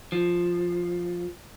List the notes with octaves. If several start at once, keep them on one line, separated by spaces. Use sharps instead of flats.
F3